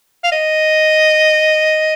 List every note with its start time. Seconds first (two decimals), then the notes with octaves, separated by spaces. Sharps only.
0.24 F5
0.32 D#5